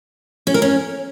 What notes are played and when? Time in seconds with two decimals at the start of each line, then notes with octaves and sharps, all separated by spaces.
0.47 C#4
0.54 A#4
0.62 C#4